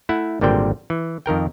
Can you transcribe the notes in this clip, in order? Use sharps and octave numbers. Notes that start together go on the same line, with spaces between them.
A3 E4 F#5
G#1 A#2 D3 G3 C4 G5
E3
F2 D#3 A#4 G5